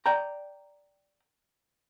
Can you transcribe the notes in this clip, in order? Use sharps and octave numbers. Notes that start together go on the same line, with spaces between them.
D5 G5 A#5